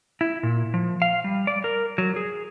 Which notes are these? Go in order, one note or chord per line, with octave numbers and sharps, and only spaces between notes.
E4
A#2
F3
F5
G3
D5
A#4
F#3
G#4